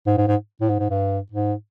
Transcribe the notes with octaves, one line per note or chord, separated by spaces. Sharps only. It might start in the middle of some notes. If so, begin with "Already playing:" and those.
G#2
G#2
G#2
A2
G#2
G#2
G2
G#2